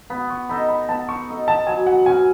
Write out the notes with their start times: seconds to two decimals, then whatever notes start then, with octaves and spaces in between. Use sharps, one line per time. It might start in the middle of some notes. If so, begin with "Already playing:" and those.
0.10 B3 B5
0.30 C#6
0.49 D#4 A4 D#5 B5
0.69 B5
0.89 B3 A5
1.09 C#6
1.29 D#4 A4 D#5
1.48 A5
1.67 F#3 G#5
1.87 F#5
2.06 C#4 F#4 G#5